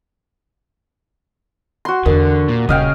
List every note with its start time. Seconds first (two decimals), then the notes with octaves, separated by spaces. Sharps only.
1.85 F#4 C6
2.06 E2 D3 A#4
2.49 A#2
2.69 D#1 C#3 D#5 F5 G5